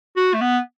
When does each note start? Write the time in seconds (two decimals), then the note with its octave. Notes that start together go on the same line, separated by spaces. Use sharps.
0.17 F#4
0.34 A3
0.41 B3